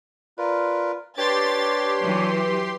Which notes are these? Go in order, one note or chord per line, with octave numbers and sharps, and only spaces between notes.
F4 A#4 B4 D5
D4 G4 B4 C#5 C6 A6
E3 F#3